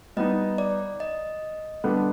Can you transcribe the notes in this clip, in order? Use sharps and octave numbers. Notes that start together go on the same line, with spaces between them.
G3 B3 D#4 D#5
D5
D#5
D3 G3 B3 D4